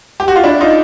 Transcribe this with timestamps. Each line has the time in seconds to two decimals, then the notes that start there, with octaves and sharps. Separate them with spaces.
0.20 G4
0.28 F#4
0.36 F4
0.44 D4 E4
0.61 D#4 F4